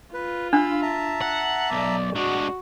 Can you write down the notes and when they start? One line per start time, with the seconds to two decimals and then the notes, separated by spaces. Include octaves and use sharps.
0.14 F4 B4
0.53 D4 F5 B5 E6
0.82 E5 A5 A#5
1.21 F#5
1.72 B1 D5
2.15 G#3 D4 F#4